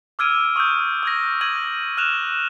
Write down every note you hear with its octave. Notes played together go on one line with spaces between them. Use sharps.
D6 E6 F6 G#6 D7 D#7
C#6 D#6 E6 G6
D#6 G#6 A#6
C#6 G#6 D#7 F#7
F6 F#6 E7 F7